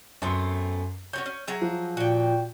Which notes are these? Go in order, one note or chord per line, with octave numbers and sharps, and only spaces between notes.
F#2 A3 B3 C4 C6
C#4 F#4 C#5 G6
C#4
F#3 G#4 E5
F3
A#2 F#4 G5